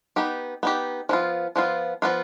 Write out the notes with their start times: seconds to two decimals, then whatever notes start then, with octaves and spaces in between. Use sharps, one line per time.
0.16 B3 D#4 G4
0.63 B3 D#4 G4
1.09 F3 B3 F4
1.56 F3 B3 F4
2.02 F3 B3 F4